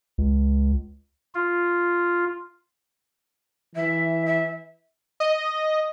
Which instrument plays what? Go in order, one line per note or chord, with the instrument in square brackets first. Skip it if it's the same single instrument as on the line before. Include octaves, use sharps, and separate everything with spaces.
[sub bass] C#2
[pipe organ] F4
[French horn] E3 [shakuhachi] E5
[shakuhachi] E5
[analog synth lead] D#5